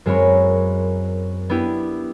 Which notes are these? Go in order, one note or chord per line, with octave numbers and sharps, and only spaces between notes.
F#2 G#3 C4 A#4 C#5 B5
B3 D4 E4 G4